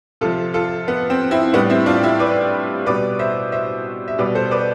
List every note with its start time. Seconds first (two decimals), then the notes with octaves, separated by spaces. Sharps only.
0.21 C3 F3 F4 A4
0.54 F4 A4
0.88 B3
1.10 C4
1.31 C4 E4
1.53 A2 G3 B3 D4
1.70 C4 E4
1.86 D4 F4
2.03 E4 G4
2.19 B4 D5
2.86 B2 G3 B4 D5
3.19 C5 E5
3.52 C5 E5
4.08 E5
4.18 B2 G3 B4 D5
4.35 A4 C5
4.51 B4 D5